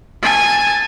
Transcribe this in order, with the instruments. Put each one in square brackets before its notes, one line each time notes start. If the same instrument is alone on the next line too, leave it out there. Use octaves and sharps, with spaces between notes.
[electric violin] G#5 A5